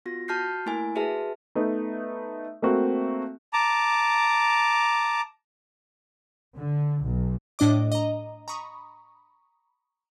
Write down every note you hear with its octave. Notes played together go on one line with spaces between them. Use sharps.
B3 F4 F#4 A#6
F#4 A5 F6 G6 C7
A3 A#3 E4 A#4 G#5
F#4 G#4 B4 E5 A5
A3 B3 D#4
A3 A#3 C4 F#4
A5 A#5 D6
D3
B1
A2 D4 D#5 D6
D#5 A#5
A#5 B5 C#6 D#6